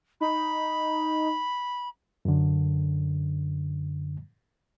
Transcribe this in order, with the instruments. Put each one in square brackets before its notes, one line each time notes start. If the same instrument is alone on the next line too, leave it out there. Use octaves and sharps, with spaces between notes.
[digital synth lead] D#4 [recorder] B5
[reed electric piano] F#2 D3